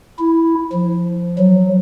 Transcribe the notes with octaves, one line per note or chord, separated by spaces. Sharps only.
E4
F3
F#3